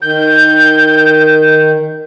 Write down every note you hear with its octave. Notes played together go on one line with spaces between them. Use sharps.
D#3 G6